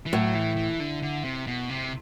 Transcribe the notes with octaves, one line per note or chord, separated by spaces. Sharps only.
E3
A2 F#3
E3
E3
D3
D3
C3
B2
C3